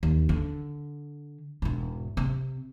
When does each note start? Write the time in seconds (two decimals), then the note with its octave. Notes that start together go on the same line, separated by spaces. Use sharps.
0.03 D#2
0.29 D3
1.62 E1 G#2
2.17 C3